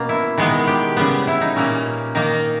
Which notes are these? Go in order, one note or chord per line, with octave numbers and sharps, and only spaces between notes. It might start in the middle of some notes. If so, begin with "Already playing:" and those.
Already playing: B2 A#3 C#4
E4
D#3 G#3 B3
G4
C#3 G3 B3
E4
D#4
A#2 A#3 C#4
D#3 A#3 D#4